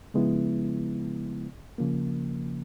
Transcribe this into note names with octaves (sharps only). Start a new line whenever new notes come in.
C#3 F3 G#3 B3 E4
C#3 F3 A#3